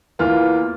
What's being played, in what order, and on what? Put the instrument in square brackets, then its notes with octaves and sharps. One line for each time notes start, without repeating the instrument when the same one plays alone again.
[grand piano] E2 E3 A#3 F4 F6